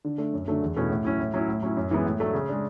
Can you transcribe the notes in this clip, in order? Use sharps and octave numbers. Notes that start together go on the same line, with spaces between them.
D3
A3 D4
F#2
D3 F#3 A3
E2
B2 A3 C#4 E4
A2
F#3 C#4 E4
A2
F#3 C#4 E4
A2
F#3 C#4 E4
F#2
E3 G#3 B3
A2
F#3 A3 D4
C#3
G#3 D4